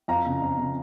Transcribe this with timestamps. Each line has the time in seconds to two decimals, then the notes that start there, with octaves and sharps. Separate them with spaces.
0.08 F2 F5 A#5
0.26 C#3
0.42 F2
0.58 C#3